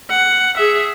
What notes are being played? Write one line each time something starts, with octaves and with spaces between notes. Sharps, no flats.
F#5
G#4 E5